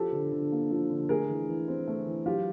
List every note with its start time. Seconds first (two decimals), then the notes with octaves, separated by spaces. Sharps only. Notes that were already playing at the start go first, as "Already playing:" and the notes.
Already playing: F3 G4 A4
0.12 D3
0.32 D3
0.52 A#3
0.71 F3
0.90 D3
1.09 A3 G#4 A#4
1.29 E3
1.49 E3
1.68 C4
1.87 A3
2.06 E3
2.26 F#3 F4 G4